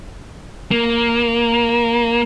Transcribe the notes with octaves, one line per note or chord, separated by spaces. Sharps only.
A#3